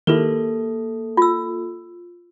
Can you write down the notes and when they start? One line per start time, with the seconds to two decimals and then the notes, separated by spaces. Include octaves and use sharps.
0.07 D#3 A#3 E4 G4 A4 A#4
1.17 F4 E6